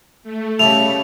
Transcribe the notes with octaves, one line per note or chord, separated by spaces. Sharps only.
A3
C#3 G3 E4 A5 F7